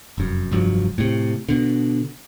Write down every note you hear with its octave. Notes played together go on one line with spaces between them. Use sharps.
F1 F#2
F1 G2 F3 F#3
A2 C3
B2 D3